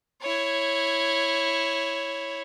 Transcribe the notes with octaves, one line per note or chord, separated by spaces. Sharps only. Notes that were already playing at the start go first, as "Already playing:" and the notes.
E4 C#5